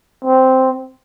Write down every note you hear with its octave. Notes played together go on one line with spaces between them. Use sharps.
C4